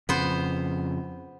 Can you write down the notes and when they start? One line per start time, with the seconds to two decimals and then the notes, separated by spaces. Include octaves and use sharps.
0.09 F2 C#3 B3 C5